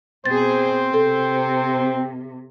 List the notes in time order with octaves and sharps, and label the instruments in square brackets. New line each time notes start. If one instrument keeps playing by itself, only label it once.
[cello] B2 G#4 [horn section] C4 [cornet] C5 [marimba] A6
[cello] C3 [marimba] A4